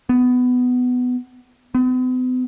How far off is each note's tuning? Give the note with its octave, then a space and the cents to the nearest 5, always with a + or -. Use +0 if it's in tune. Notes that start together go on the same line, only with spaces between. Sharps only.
B3 +15
B3 +45